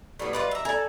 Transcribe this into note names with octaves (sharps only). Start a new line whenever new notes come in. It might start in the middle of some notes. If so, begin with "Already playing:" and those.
A2 F#3 G3 B3 D5
F4 B4 D5 D#5
E5 A#5
A4 D5 G#5 A#5